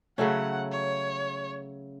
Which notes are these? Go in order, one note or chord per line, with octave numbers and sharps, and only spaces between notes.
C#3 F#3 A3 C#4 F#5
C#5